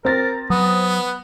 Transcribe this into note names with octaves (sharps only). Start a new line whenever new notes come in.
C4 A#4 A6 A#6
F#3 B3 D#6